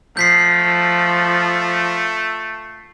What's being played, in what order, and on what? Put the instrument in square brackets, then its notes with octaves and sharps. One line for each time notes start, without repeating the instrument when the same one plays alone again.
[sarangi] F3 [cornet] A3 [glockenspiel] G6 B6 C7